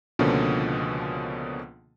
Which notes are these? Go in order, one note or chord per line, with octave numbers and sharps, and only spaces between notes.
C#2 B2 D3 F3 A#3 C#4